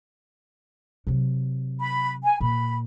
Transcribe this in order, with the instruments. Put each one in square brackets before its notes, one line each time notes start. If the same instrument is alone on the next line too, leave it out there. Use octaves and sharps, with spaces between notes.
[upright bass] C3 F#3
[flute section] B5
G#5
[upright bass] A#2 [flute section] B5